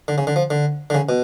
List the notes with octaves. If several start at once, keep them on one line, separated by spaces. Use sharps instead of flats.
D3
C#3
D3
F3
D3
D3
C#3
B2